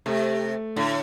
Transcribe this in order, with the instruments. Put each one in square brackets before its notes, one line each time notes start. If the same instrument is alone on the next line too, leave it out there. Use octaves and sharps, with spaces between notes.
[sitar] C3 [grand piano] A3
[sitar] A2 [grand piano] D3